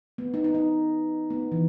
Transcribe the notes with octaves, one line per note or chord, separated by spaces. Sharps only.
B3
D#4
D#4
D#4
B3
E3